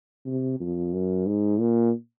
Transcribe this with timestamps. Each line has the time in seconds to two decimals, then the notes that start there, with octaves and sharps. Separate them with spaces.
0.26 C3
0.60 F2
0.93 F#2
1.27 G#2
1.60 A#2